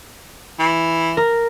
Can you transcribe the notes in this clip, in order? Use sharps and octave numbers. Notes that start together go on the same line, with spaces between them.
E3
A#4